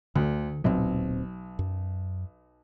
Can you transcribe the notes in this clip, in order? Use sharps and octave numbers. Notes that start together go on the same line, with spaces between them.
D2 D3
D1 B1 A#2 C4
F#2